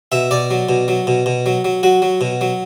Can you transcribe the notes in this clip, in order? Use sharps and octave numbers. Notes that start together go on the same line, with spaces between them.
B2 E5
B2 D5
F#3
B2
F#3
B2
B2
F#3
F#3
F#3 F#4
F#3
B2
F#3